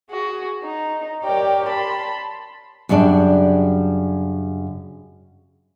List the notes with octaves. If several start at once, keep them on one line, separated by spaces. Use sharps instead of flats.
F#4 G#4
D#4
G4 A#4 C#5 D5 G5
A5 B5 C6
F#2 C#3 G3 D4